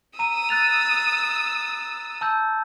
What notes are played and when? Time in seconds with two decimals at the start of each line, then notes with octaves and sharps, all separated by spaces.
0.19 A#5 D#6 E6 D#7
0.49 F#6 A6 F7
2.21 A5 E6 G6